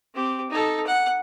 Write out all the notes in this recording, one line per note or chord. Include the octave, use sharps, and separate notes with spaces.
C4 G4
D#4 A4
F#5